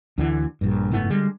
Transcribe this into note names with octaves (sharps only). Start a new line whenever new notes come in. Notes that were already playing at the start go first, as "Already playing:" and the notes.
D2 D3 E3
A#1 G2
F#1 G#2 A3 B3
D3 G3 G#3